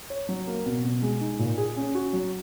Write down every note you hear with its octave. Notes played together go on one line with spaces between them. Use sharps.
C#5
F#3
A#3
B2
B2
G#3
D#4
A#2
G#4
C#4
F#4
F#3